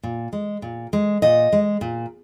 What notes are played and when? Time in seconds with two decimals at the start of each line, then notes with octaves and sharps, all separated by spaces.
0.03 A#2
0.33 G#3
0.62 A#2
0.93 G#3
1.22 A#2 D#5
1.52 G#3
1.81 A#2